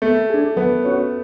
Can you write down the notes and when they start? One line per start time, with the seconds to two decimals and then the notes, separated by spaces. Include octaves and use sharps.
0.02 A3 B3
0.30 D4 G#4
0.56 F#3 B3
0.84 C#4 F#4 C#5